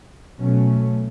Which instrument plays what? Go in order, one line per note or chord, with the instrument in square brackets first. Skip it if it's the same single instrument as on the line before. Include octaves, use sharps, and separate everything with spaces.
[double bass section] B2 F#3 A3 C#4